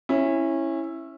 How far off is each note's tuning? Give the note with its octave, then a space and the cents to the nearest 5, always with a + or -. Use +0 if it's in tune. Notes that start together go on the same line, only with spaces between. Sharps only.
C#4 -20 E4 +0